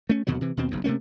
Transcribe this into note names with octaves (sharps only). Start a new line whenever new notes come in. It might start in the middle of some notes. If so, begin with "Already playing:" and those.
A3 C#4
D#2 B2 D3 F#3
C3 E3
D#2 B2 C4
F#1 B1 E2
C3 A3 A#3 C#4